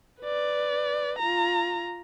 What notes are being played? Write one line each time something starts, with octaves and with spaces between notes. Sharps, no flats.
B4 D5
F4 A#5